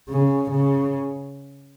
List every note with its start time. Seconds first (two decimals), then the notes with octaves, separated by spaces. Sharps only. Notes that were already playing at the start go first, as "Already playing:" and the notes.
0.09 C#3
0.51 C#3